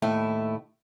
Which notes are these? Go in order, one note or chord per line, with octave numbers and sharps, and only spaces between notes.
D#2 A2 A3 E4